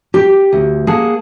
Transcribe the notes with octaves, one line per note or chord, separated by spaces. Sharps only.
G4
D2
A#3 G#4 F#5 A5